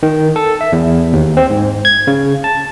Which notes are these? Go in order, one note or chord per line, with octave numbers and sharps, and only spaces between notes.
D#3
A4
E5
E2
D#2
C4
G#2
G#6
C#3
A5